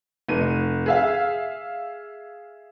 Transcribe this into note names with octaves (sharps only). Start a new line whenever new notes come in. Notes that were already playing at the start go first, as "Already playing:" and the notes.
F1 D#7
G#4 E5 F5